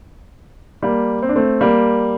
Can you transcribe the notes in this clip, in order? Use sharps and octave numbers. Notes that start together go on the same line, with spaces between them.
G3 A#3
C4
D4
A3 C4
G3 A#3